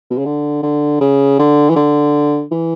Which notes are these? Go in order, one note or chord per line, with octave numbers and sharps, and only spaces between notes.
B2
C#3
D3
D3
C#3
D3
E3
D3
E3